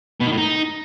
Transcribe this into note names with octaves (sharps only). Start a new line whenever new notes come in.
B2
D#3
A2
D#4